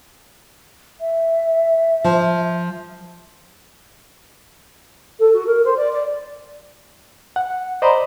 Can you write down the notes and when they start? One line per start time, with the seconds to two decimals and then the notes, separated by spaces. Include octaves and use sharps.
1.01 E5
2.04 F3
5.19 A4
5.33 F#4
5.46 A#4
5.64 C5
5.76 D5
5.92 D5
7.36 F#5
7.82 C5 D5 D#5 A#5 B5